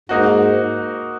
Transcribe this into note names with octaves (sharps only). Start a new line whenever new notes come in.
G#2 A#3 D#4 F#4